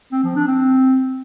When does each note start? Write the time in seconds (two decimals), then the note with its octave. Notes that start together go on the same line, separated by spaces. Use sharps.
0.12 C4
0.24 F3
0.36 D4
0.48 C4